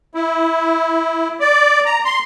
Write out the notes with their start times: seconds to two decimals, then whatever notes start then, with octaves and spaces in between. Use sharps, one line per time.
0.14 E4
1.40 D5
1.86 A#5
2.05 C6